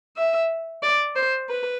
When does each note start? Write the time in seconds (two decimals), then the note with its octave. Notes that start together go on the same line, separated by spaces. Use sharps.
0.17 E5
0.83 D5
1.16 C5
1.49 B4